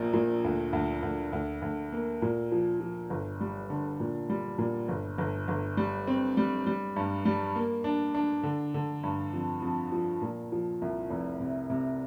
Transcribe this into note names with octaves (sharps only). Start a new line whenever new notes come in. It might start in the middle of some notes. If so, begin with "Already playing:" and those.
Already playing: A#1 A#2
A#2
D2
D2
D2
D2
D2
A#3
A#2
F3
F3
G1
G3
D3
A#2
G3
A#2
G1
G1
G1
G3
C4
G3
G3
G2
G3
A#3
D4
D4
D3
D3
G2
F2
F2
F3
A#2
F3
C2
F1
C3
C3